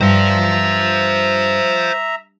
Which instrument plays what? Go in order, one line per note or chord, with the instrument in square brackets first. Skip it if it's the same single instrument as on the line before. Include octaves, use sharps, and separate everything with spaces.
[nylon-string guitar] G2 [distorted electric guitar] C5 F5 [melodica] E5 A#5